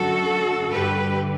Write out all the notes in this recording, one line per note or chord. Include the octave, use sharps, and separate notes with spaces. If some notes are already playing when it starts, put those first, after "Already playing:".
Already playing: F#2 D3 F#4 A4
G2 D3 G4 B4